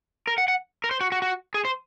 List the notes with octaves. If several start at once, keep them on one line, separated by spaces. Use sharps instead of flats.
A#4
F#5
F#5
A#4
C5
F#4
F#4
F#4
G#4
C5